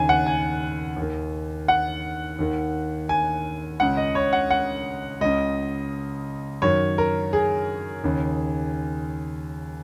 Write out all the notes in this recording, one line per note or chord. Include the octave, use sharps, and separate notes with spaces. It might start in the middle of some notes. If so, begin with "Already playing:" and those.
Already playing: D#2 C#3 G#5
F#5
G#5
D#2
D#3
F#5
D#2 D#3
G#5
C#2 C#3 F#5
D#5
C#5
F#5
F#5
C#2 C#3 D#5
F#2 D#3 C#5
A#4
G#4
D#2 C#3